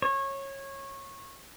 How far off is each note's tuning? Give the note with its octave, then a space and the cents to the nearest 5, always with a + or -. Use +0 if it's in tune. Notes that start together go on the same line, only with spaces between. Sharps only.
C#5 -20